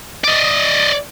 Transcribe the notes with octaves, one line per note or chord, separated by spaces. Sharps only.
D5 D#5